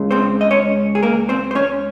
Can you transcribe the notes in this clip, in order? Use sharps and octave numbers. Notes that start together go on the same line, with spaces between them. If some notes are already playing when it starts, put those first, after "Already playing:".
Already playing: C#2 C#3 G#3
C4 C5
D#5
C#4 C#5
G#4
A#3 A#4
C4 C5
C5
C#4 C#5